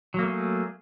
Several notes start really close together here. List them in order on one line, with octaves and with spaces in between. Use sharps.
F#3 A#3 A3 G#4